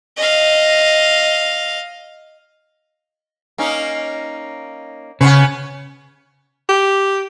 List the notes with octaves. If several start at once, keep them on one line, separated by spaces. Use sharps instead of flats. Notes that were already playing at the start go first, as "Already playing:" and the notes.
D#5 F5
A#3 C#4 D#4
C#3 B3 C#4 B4
G4